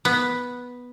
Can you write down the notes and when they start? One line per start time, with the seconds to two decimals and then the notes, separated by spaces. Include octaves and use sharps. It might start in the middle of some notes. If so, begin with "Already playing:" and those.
0.05 B3